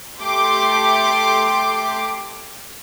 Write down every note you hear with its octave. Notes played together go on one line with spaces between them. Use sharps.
A3 G4 C6 D6